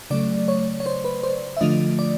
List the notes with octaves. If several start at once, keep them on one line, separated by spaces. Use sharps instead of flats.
C#3 F#3 A3 D5
C#5
C#5
C5
B4
C5
E5
D3 F3 A3 D4 F4 D#5
D5